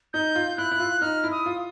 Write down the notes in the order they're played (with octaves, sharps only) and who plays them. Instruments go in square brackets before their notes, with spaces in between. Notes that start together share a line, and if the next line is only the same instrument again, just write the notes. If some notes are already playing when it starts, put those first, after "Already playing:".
[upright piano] D#4 [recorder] G6
[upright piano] F4
[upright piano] E4 [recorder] F#6
[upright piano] E4
F4
[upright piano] D#4 [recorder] F6
[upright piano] E4
[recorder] D#6
[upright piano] F4